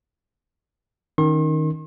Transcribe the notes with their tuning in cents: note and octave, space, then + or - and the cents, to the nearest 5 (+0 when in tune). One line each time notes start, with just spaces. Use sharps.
D#3 +0 C#4 +0 C6 +45